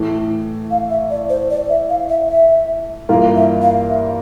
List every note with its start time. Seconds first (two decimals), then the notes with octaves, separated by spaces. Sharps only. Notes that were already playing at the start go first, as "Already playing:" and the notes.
Already playing: A2 E3 A3
0.71 F5
0.90 E5
1.10 D5
1.29 C5
1.50 D5
1.69 E5
1.89 F5
2.09 E5
2.30 E5
3.09 G2 E3 A#3 F4 A#4 F5
3.36 E5
3.62 F5
3.89 E5